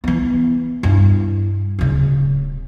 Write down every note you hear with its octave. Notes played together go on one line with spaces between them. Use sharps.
E3 B3
G2 E4
D1 C#3